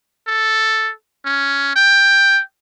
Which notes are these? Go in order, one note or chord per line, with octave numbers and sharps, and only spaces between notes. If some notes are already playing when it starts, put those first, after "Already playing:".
A4
C#4
G5